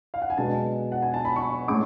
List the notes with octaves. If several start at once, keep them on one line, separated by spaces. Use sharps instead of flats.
F5
F#5
G#5
B2 G#3 B3 D4 A5
F#5
G#5
A5
B5
C#6
A2 G#3 C#4 D6